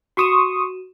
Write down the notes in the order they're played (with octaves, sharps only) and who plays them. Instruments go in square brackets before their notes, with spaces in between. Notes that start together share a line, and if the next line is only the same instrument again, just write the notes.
[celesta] F#4 D#7 E7 [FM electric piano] C6 C#6 D#6